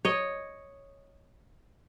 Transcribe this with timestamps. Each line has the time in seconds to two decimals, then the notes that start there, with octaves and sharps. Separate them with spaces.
0.05 C#5 D#5